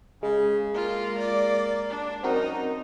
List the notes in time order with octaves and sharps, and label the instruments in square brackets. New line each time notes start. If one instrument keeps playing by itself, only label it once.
[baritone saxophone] C#3 [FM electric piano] G#3
[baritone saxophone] A#3 [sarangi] F4
[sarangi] D5
D4
[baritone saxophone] F#2 [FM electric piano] C4 F#4 A#4 [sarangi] D#4